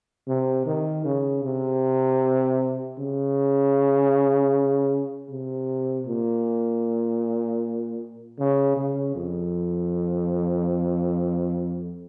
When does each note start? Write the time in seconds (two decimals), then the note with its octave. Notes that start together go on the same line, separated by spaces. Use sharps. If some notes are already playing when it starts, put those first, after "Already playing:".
0.28 C3
0.66 D#3
1.04 C#3
1.43 C3
2.98 C#3
5.30 C3
6.07 A#2
8.39 C#3
8.77 C#3
9.15 F2